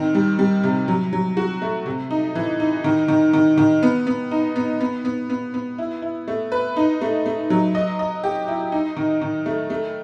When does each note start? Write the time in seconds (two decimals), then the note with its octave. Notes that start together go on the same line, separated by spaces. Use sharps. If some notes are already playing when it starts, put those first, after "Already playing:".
Already playing: D#3 C4
0.15 G3
0.39 G3
0.63 C3
0.88 F#3
1.13 F#3
1.37 F#4
1.62 A3
1.86 C3
2.11 D#4
2.35 E3
2.60 D#4
2.84 D#3
3.08 D#3
3.33 D#3
3.58 D#3
3.83 B3
4.07 B3
4.31 D#4
4.56 B3
4.81 B3
5.05 B3
5.30 B3
5.54 B3
5.78 E4
6.02 E4
6.28 A3
6.52 B4
6.77 D#4
7.01 A3
7.26 A3
7.50 F#3
7.75 D#5
7.99 D#5
8.24 G4
8.48 E4
8.72 D#4
8.97 D#3
9.21 D#3
9.46 A3
9.70 A3